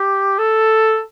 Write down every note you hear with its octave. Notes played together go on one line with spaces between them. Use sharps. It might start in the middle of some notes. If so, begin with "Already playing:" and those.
Already playing: G4
A4